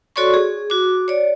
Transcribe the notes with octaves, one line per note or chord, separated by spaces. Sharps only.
F#4 A4 C#5 D5 C6 C#6
G#4
F#4 D6
C#5 D5